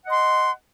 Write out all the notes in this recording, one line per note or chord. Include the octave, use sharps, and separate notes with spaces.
D#5 F#5 C6